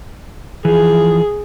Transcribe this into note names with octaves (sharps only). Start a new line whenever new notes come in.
E3 F3 G#4